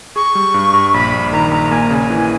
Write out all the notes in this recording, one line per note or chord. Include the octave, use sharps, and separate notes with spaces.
G#4 C#6
G3
G2
G2
A#1 B5
A#1
D#3 A#5
A#1 A#5
A#3 G#5
A#5
C#3 G#5
E3